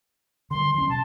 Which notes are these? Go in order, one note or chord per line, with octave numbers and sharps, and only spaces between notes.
D3 E3 G3 C6
E3 F#3 C#4 C6
B2 A5